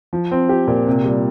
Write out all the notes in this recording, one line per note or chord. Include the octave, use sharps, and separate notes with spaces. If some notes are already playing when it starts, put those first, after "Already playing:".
F3
C4
G4
A#2
C3
G3